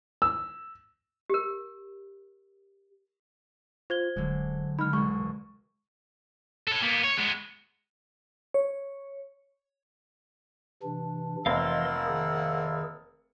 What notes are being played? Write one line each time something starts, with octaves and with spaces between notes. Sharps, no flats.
E6
G4 A#4
F4 C5 G#6 G7
D1 D3 F#3 G#3
D3 G#3 B3 D#4 B5 F6
E1 C2 G#3 C#6
A4 C#5
A#3 B3
C#5
G#3 B3
C#5
C3 E3 D4
F1 E3 A#3 D#5 F5 F#5 C6 E6
D#3 G#4